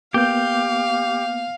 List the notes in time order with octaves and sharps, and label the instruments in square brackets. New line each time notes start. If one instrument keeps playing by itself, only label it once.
[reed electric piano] A#3 B3 G6 [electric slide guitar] G4 [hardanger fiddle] F5